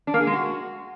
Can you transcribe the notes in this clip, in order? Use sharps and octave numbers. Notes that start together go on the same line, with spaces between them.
D4
A#3
G#4
G#3
F#4